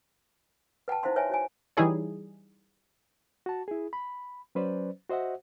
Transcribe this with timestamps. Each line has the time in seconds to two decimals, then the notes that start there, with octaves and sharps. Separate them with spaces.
0.88 B4 F#5 G5 A5
1.03 D#4 E4 C5 F5 F#5 C6
1.16 B4 C#5 E5 F#5 G#5
1.30 F#4 C#5 G#5
1.77 E3 G3 D#4 E4 G#4 C#5
3.46 F#4 A5
3.68 E4 G#4
3.93 B5
4.55 F#3 C#4 B4 C5 D5
5.09 F#4 C5 D#5 E5 F#5